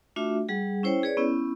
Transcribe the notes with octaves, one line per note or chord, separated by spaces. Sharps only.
A3 D4 F4 F#4 E5
G3 G#4 F#5
C#4 E4 C5 C#5 G5
G#4 B4 C#5 D5
B3 C#4 E4